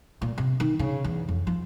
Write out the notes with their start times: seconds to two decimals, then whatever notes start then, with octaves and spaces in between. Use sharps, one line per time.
0.22 A#2
0.38 C3
0.60 D#3
0.79 C#3
1.04 E2
1.28 F2
1.47 F3